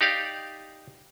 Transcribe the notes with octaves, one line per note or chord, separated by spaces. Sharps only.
D#4 G4 D5 F5